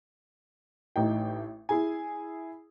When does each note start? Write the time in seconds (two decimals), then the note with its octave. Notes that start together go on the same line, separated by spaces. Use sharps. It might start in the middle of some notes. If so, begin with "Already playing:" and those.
0.96 A1 A2 D#4 G5
1.69 E4 G#4 G#5